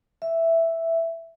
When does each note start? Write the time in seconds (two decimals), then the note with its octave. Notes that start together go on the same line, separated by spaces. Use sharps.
0.22 E5